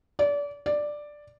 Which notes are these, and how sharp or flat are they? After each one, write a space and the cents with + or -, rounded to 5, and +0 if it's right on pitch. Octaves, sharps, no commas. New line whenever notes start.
D5 -30
D5 +5